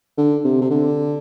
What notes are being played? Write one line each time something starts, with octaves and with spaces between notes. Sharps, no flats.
D3
C3
C3
D3